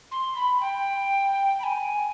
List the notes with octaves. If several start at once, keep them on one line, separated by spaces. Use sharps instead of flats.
C6
B5
G5
B5
G#5